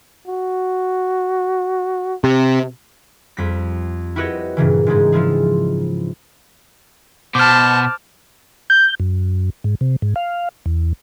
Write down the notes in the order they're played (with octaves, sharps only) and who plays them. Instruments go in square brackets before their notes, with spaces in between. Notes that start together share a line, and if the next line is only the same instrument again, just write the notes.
[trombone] F#4
[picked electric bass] C3
[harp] F2 G3 B6
E4 F#4 G4 B4 C#5 D#5
G2 A#2 C#3 E3
G#2 C#3 G3 G#3 D#4
F3 E4 F4 G#4
[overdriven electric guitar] B2 [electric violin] C5 A5 [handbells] D6 F6
[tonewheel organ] G6
F#2
G#2
C3
G#2
F5
E2